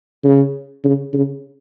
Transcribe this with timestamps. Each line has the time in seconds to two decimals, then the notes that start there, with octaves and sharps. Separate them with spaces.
0.24 C#3
0.84 C#3
1.13 C#3